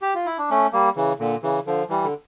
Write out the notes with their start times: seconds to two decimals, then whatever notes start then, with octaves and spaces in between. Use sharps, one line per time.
0.02 G4
0.15 F4
0.26 E4
0.38 D4
0.51 A3 C#4
0.73 G3 A#3
0.96 C#3 E3
1.19 A#2 D3
1.43 C#3 E3
1.66 D3 F3
1.89 E3 G3
2.04 D3